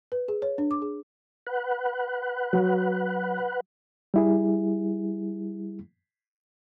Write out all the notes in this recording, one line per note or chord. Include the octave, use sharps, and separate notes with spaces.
B4
G#4
C#5
D4
D6
G#4
B4 F#5
F#3
G3 E4 G#4